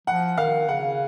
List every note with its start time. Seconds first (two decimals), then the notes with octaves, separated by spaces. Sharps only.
0.07 F3 F#5
0.37 D#3 F5
0.69 C#3 F#5